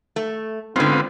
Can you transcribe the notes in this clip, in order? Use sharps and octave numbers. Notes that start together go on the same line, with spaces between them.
A3
G#2 D3 B3 C4 F4